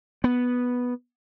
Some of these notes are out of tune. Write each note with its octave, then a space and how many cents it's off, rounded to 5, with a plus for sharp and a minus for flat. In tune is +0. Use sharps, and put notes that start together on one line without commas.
B3 -5